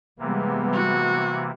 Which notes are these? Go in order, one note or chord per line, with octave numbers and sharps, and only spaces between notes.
C3 E3 G3 G#3 A#3 B3
F#4